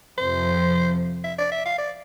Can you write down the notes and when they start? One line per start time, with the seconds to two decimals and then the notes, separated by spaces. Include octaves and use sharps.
0.18 F2 C3 F3 C5
1.24 E5
1.38 D5
1.52 E5
1.65 F5
1.78 D5